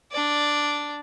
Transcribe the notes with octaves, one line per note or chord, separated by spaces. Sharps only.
D4 D5